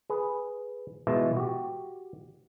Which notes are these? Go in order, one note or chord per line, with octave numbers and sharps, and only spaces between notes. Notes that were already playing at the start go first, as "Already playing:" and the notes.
G#4 B4
B2 E3 G#3 F4 E5 A5
F#4 G4